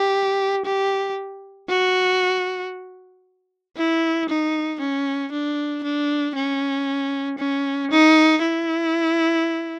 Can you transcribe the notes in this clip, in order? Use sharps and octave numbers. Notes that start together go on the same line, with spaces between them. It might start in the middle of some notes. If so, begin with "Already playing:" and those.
Already playing: G4
G4
F#4
E4
D#4
C#4
D4
D4
C#4
C#4
D#4
E4